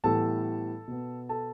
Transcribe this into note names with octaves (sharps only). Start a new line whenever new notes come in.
A2 E3 G3 B3 A4 A5
B2 B3
A4 A5